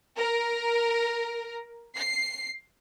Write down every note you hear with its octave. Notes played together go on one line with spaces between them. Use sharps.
A#4
C7